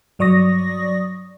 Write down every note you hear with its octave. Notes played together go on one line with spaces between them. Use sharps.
G2 F#3 D5 C#6 D#6 A#6